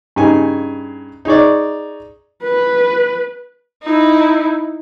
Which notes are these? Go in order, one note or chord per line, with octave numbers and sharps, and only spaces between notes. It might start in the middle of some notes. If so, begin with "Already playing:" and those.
G2 C#3 D#4 G#5
D#4 G#4 C#5 D5
B4
D#4 E4